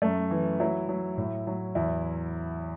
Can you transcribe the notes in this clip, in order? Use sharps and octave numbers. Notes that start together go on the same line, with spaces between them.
F#2 A3
E3
F#3 E4
F#3
A2
F#3
E2 E4